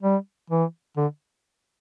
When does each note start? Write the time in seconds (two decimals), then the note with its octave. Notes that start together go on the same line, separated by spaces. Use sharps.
0.02 G3
0.50 E3
0.97 D3